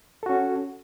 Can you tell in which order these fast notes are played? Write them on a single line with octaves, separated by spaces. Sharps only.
A4 F#4 C#4